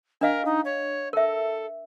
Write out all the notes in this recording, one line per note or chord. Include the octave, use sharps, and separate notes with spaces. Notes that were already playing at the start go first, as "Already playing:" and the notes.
D4 A#4 D#5 F5
D#4
C#5
A4 A#4 E5